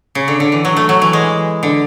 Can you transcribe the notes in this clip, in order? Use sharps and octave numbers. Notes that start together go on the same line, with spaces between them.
C#3
D3
D3
E3
F#3
A3
F#3
E3
G#3
D3